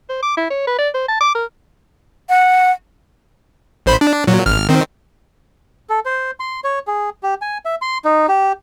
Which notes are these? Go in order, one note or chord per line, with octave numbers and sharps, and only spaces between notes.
C5
D6
E4
C#5
B4
D5
C5
A5
D6
A#4
F#5
A1 C5 B5
D4
A#2 F#3
G#1 F6
D#3 C4
A4
C5
C6
C#5
G#4
G4
G#5
E5
C6
D#4
G4